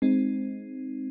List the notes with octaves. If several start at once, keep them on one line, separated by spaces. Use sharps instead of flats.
G#3 C4 D#4